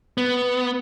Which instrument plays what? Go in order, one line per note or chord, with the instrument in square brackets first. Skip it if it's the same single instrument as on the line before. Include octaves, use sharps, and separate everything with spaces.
[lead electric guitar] B3